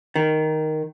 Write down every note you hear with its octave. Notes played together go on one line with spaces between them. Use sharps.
D#3